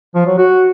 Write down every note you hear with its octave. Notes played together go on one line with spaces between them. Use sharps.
F3
F#3
F#4